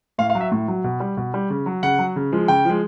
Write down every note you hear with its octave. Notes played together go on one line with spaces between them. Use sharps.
A2 F5
F5
F#3
E5
A2
F#3
B2
G3
B2
G3
C#3
F#3
C#3 F#5
F#3
C#3
F3 G#3
C#3 G5
F3 G#3